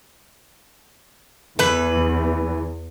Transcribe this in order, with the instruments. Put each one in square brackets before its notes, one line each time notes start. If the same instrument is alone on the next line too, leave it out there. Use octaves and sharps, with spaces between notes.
[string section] E2 [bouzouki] E3 B4